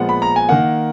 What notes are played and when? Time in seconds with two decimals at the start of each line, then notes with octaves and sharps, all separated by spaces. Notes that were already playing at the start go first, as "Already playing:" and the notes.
Already playing: A#2 F3 G#3 B3 F#5
0.09 B5
0.22 A#5
0.36 G#5
0.49 D#3 A#3 F#5